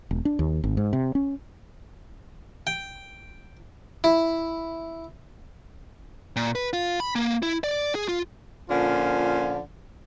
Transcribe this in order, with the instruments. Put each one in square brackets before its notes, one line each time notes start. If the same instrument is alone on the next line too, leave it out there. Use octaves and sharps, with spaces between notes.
[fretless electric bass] E1
D4
D#2
G#1
G#2
C3
C#4
[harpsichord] G5
E4
[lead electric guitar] A#2
B4
F4
B5
A#3
E4
D5
G#4
F4
[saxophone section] A#2 D3 F3 C#4 F4